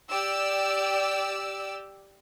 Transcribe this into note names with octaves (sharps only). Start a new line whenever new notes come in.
G4 D5 E6